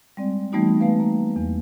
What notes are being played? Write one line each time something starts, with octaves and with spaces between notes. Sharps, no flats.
G3 G#3 C4 D5
E3 G3 A3 B3 D#4 F#4
G#3 A3 B3 B4 F5
A#3
E2